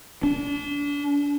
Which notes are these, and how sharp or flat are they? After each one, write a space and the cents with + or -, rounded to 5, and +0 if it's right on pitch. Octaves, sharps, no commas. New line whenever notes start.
D4 -35